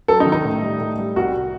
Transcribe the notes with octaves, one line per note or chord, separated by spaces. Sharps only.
F#3 A4
D#4
D#3
D#4
A2
G3
A2
G3
C2 F#4